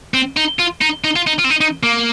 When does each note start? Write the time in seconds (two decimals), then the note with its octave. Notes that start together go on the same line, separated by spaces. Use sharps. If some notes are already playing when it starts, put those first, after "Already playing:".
0.14 C4
0.37 D#4
0.59 F4
0.81 D#4
1.04 D#4
1.16 F4
1.27 D#4
1.39 F4
1.44 C4
1.50 D#4
1.61 D#4
1.83 A#3